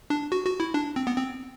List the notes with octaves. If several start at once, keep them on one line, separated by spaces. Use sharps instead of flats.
D4
F#4
F#4
E4
D4
C4
B3
C4